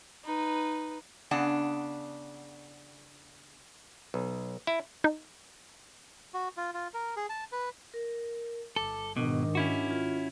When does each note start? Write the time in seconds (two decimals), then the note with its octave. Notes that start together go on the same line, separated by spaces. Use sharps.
0.25 D#4 B4
1.31 C#3 B3 D4 F#5
4.14 B1
4.67 E4
5.04 D#4
6.34 F#4
6.57 F4
6.74 F4
6.94 A#4
7.16 G#4
7.29 A5
7.52 B4
7.94 A#4
8.76 G1 A4 D6
9.17 G#2 B2 D#3 D4
9.55 C#4 E4 F#4
9.91 F4